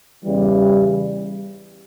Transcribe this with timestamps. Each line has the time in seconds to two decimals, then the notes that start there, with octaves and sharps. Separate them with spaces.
0.25 E2 C#3 E3 G3